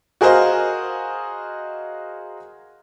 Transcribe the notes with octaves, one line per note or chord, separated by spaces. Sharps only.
F#4 G#4 A#4 C5 D#5 F5